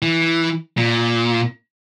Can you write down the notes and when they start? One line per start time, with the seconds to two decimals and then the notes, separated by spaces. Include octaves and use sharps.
0.02 E3
0.77 A#2